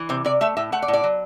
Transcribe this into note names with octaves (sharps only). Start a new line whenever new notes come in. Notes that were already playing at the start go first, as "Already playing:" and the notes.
Already playing: E3
C3 C5
C3 D5
A3 E5
A2 E5
A3 F#5
D5
A2
D5
F#3